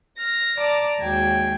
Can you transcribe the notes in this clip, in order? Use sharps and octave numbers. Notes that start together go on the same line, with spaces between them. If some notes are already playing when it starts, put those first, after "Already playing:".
F6 A#6
D5 A5 A#5 D6
D#2 G#3 F#4 G5 G#6